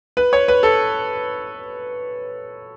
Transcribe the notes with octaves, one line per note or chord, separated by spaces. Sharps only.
B4
C#5
B4
A4